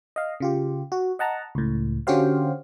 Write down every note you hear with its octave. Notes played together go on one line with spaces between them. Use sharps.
D#5 F5
C#3 F4 G4
F#4
D#5 F#5 A5 A#5
C#2 A2
D3 C#4 F#4 G4 C5 F5